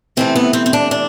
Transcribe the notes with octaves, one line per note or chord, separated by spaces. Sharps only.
C3 E3 A3 C4
B3
C4
C4
D4
D4